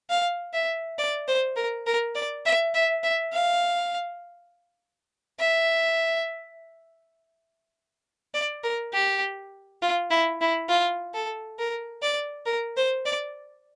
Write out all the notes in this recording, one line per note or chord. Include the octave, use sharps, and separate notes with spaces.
F5
E5
D5
C5
A#4
A#4
D5
E5
E5
E5
F5
E5
D5
A#4
G4
F4
E4
E4
F4
A4
A#4
D5
A#4
C5
D5